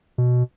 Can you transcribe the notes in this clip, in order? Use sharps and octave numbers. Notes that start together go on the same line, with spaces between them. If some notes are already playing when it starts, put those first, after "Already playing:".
B2